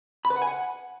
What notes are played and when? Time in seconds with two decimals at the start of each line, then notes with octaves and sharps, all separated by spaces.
0.25 B5
0.30 B4
0.36 F#5
0.42 G#5
0.47 F#5